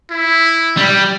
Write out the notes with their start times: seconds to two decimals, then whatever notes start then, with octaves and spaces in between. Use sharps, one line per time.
0.11 E4
0.77 G3